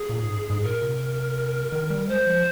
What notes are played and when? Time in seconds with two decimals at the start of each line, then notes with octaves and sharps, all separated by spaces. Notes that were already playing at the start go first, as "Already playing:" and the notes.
Already playing: G#4
0.09 A#2
0.23 G#2
0.37 G2
0.50 G#2
0.64 A#2 A#4
0.82 C3
1.72 D#3
1.90 G3
2.08 G#3 C5
2.26 F3